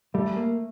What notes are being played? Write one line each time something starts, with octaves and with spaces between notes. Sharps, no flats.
G3 A3
A#3